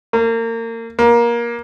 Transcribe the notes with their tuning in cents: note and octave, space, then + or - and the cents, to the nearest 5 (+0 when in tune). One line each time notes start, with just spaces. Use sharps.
A#3 -30
A#3 +20